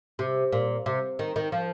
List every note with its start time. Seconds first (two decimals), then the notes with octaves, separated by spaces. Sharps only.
0.19 C3
0.52 A#2
0.86 C3
1.19 D#3
1.36 D#3
1.52 F3